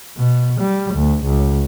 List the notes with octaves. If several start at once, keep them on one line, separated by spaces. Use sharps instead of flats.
B2
G3
D2
C#2